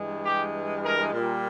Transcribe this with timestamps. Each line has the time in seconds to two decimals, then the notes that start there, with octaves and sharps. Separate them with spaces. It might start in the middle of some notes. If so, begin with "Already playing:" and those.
Already playing: G2 E3 G#3
0.24 G4
0.83 A#4
1.13 A#2 G3